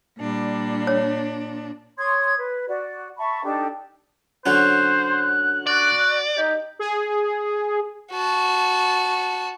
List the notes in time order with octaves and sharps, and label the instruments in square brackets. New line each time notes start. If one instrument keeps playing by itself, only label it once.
[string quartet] A#2 D4 [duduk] G3
[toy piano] C#5
[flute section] C#5 C6 D#6 G#6
B4
F#4 D5
E5 A5 B5 C#6
D4 D#4 G4 A4
[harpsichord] D3 F#3 C#4 [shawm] C5 [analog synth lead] F#6
[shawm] F#4 [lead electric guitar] D5
[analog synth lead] D#4 [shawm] G4
[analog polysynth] G#4
[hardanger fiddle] F#4 A5